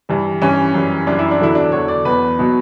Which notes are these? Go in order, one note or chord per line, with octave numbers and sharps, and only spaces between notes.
G2 E3 G3
G2 E3 G3 C#4
F#2 E3 G3
F#2 E3 G3 D4
E4
D4
E2 D3 F#3 E4
D4
E2 D3 F#3 C#5
D5
E2 B2 F#3 B4
B2 F#3